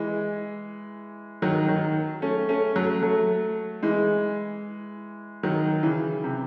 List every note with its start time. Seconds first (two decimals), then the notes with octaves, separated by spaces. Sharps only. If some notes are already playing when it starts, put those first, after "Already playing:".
Already playing: E3 G#3
1.42 D#3 F#3
1.68 D#3 F#3
2.22 A3 C#4
2.49 A3 C#4
2.76 F#3 A3
3.02 F#3 A3
3.83 E3 G#3
5.43 D#3 F#3
5.83 C#3 E3
6.24 C3